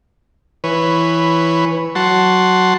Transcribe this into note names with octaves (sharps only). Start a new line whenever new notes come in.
E3 B4 C#5
F#3 F#5 A5 C6